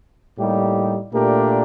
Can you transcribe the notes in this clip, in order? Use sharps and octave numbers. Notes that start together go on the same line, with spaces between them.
A2 G3 A#3 D#4 G4
A#2 A3 D4 G4 A#4